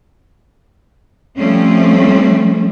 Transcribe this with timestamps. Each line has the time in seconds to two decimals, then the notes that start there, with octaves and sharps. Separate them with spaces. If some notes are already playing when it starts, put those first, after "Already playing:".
1.38 F3 G3 A3 C4 C#4